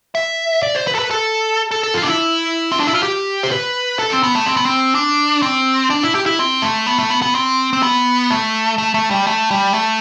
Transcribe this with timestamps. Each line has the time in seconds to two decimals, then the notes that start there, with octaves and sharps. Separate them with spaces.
0.15 E5
0.63 D5
0.75 C5
0.87 B4
0.95 A4
0.99 B4
1.11 A4
1.71 A4
1.83 A4
1.94 F4
2.03 D4
2.07 E4
2.72 C4
2.80 D4
2.87 E4
2.95 F4
3.03 G4
3.43 C5
3.51 B4
3.99 A4
4.10 C4
4.23 B3
4.35 A3
4.46 C4
4.56 B3
4.65 C4
4.95 D4
5.42 C4
5.90 D4
6.03 E4
6.15 G4
6.26 E4
6.39 C4
6.62 A3
6.86 B3
6.98 A3
7.10 B3
7.22 B3
7.35 C4
7.73 C4
7.83 B3
8.30 A3
8.78 A3
8.94 A3
9.11 G3
9.27 A3
9.51 G3
9.74 A3